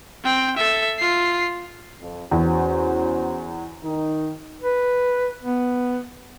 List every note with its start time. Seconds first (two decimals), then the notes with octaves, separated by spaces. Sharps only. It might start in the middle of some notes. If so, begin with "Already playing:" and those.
0.24 C4 G5
0.57 A4 E5
0.99 F4 C7
2.00 F2
2.31 E2 C#4 F#4 C5
3.83 D#3 D#4
4.61 B4
5.44 B3